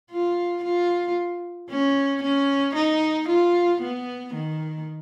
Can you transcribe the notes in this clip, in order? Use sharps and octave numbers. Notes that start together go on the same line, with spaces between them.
F4
F4
C#4
C#4
D#4
F4
B3
D#3